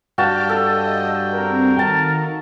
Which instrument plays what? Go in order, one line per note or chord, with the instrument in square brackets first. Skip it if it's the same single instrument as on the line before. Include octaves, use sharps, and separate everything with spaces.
[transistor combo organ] G2 G5 [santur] F#4 F5 A5 [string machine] G4 D6 F6
[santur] A4 [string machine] D#5
[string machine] C4 [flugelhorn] A#4
[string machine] D#3 [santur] A5